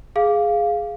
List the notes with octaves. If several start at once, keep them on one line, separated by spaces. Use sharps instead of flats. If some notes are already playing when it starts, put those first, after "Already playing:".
G#4 F5